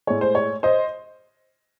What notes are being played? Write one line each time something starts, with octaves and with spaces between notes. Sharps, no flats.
A2 G#3 C#5
C5
C#5
C5 D#5